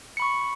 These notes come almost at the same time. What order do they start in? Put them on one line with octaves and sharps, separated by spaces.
C#7 B5 C#6